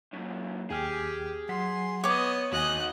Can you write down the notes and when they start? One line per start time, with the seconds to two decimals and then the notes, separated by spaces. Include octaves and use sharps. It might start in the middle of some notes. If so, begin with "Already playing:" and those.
0.13 F#2 A#2
0.71 D#2 G4 G#4 G5 F6
1.49 F#3 F#5 C6 B6
2.04 B3 C#5 D#5 D6
2.52 D#2 D#4 F#4 D#5 G#5 F#6